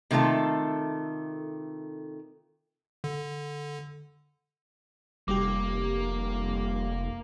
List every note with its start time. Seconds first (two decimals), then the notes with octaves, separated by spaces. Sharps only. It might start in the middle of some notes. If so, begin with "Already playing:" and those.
0.11 C3 D#3 A3 F4 A4
3.04 D3
5.28 F1 G3 A#3 G4 D6